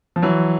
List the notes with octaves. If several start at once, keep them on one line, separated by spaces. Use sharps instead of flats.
F3
E3 F#3